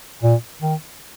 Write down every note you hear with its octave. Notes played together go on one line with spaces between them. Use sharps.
A#2
D#3